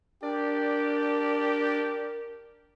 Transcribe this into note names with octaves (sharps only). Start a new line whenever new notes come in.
D4 G4 A#4 D5